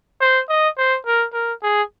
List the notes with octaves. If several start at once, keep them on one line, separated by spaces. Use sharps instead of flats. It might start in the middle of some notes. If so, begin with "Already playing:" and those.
C5
D#5
C5
A#4
A#4
G#4